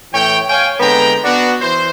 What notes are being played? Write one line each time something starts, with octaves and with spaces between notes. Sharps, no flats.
A2 E3 C#5 G5
C#5 F5 G5 G#5
D3 G#3 B3 C4 G5 A#5
B3 D4 F#4
E3 C5